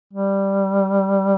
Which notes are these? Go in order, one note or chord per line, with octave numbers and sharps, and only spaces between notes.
G3